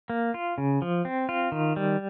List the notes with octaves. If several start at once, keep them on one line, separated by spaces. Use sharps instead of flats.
A#3
F4
C#3
F3
C4
F4
D#3
G3